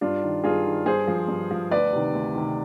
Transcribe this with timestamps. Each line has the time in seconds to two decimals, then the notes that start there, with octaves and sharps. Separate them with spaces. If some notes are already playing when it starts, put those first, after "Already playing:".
0.01 G2 D4 F4
0.23 D#3
0.44 G2 F4 G#4
0.66 D#3
0.86 G2 G#4 C5
1.07 F3
1.28 G2
1.51 F3
1.71 D2 B4 D5
1.93 C3 D#3
2.13 D2
2.35 C3 D#3